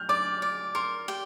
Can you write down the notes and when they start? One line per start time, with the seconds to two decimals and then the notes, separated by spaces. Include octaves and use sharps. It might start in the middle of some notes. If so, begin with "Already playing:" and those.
Already playing: F6 G6
0.09 D5 D6
0.42 D5
0.75 A#4 C6
1.08 G4